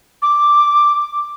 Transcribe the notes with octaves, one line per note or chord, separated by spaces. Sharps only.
D6